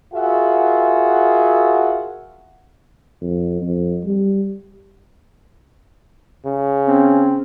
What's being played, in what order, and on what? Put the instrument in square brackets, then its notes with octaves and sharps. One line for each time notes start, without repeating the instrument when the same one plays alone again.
[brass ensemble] F4 F#4 G#4 A#4 E5 F#5
[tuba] F2
F2
G3
[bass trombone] C#3
[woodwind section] C4 C#4